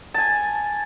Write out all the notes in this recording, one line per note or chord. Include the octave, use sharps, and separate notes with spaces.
G#5 A5